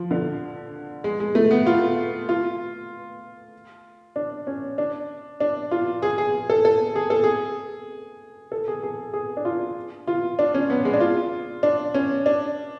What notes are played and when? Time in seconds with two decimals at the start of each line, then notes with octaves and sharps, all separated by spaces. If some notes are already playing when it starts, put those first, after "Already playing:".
Already playing: F3
0.11 D3
1.04 G#3
1.20 G#3
1.35 A3
1.51 B3
1.67 F4
2.29 F4
4.16 D4
4.47 C#4
4.78 D4
5.40 D4
5.71 F4
6.02 G#4
6.18 G#4
6.50 A4
6.65 A4
6.95 G#4
7.10 A4
7.24 G#4
8.52 A4
8.68 G#4
8.83 G#4
9.14 G#4
9.37 D4
9.45 F4
10.07 F4
10.39 D4
10.54 C#4
10.70 B3
10.85 G#3
10.93 D4
11.00 F4
11.63 D4
11.94 C#4
12.26 D4